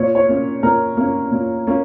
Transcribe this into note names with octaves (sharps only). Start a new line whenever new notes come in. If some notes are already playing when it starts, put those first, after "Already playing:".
Already playing: A#2 C#5
C#5
A#3 C#4
A#2 A#4
A#3 C#4
A#2
A#3 C#4